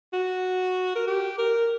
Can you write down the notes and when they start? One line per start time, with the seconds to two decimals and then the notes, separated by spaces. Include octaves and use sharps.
0.13 F#4
0.95 A#4
1.07 G4
1.38 A#4